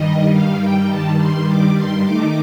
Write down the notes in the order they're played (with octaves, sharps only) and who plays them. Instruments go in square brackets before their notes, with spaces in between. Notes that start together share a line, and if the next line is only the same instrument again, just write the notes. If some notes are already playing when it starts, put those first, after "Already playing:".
Already playing: [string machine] G2 D#3 G3 D#5
F5
G5
A5
C6
D6
C6
D#3 A3 D#4 D6